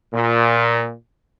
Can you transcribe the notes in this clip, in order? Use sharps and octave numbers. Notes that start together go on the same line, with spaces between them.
A#2